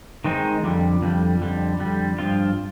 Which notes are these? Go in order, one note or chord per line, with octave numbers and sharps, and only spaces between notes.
D#3 G#3 C4 D#4
F2 D3 G3
F2 D3 G3
F2 D3 G3
F2 D3 G3
G2 F3 C4 F4